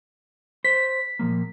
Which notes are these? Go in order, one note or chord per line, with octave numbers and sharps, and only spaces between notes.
C5 B6
A#2 F3 A#3